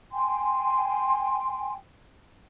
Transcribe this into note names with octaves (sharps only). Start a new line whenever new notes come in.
G5 G#5 C6